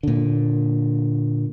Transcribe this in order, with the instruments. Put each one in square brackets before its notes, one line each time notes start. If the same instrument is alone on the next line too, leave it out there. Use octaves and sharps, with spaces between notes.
[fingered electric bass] A#2 D3